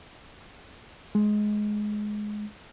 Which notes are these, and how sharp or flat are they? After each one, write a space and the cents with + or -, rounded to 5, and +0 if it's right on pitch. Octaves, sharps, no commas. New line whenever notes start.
G#3 +15